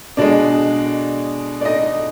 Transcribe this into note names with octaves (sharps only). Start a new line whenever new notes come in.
B2 G#3 D4 D5
D5
D#4 D#5